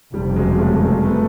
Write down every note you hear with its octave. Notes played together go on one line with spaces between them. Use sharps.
F#1 F2 C3 F3 G3
F#3 G#3
G3 A3
A3
G#3 A#3
A3 B3